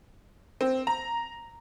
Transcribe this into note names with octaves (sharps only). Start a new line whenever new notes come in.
C4
A#5